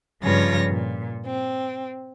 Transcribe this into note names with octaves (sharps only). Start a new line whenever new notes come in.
G2 C#3 F3 F4 C#5 A#6
A#2
C4